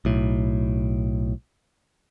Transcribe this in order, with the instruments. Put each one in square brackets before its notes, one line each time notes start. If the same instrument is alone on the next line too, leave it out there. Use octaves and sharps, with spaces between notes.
[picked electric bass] B1 A2